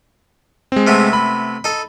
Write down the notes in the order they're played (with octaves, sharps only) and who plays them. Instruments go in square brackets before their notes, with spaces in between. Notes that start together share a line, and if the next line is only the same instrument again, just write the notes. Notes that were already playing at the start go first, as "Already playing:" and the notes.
[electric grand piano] G#3 C4
[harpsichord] C3 A3 B3
[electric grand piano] B5
[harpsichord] D#4 A4